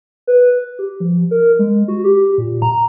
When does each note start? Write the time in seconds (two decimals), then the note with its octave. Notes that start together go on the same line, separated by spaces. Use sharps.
0.27 B4
0.79 G4
1.00 F3
1.31 A#4
1.59 G#3
1.88 F#4
2.04 G4
2.38 A#2
2.62 A#5